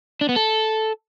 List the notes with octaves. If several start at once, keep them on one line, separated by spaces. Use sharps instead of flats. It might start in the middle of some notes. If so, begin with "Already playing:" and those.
D4
B3
A4